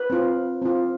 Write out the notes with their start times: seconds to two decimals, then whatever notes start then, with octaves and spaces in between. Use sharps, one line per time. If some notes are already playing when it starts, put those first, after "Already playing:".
Already playing: B4
0.10 C4 F4
0.62 C4 F4